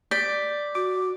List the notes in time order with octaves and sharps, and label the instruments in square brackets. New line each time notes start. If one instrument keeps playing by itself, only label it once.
[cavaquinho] D5 [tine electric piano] G6 B6
[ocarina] F#4 [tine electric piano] D6